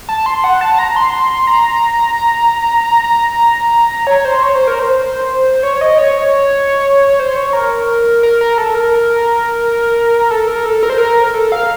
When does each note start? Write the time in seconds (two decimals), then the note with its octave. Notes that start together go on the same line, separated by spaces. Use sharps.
0.09 A5
0.26 C6
0.44 F#5
0.61 A5
0.74 A5
0.78 A#5
0.96 C6
1.47 A#5
3.04 A#5
4.07 C#5
4.25 C5
4.43 C#5
4.55 C5
4.67 A#4
4.79 C5
5.63 C#5
5.81 D#5
5.98 C#5
7.20 C5
7.36 C#5
7.53 A#4
8.23 A#4
8.41 A#4
8.58 A4
8.75 A#4
10.31 A4
10.47 A#4
10.66 A4
10.83 A#4
10.90 C5
10.98 A#4
11.34 A4
11.52 F5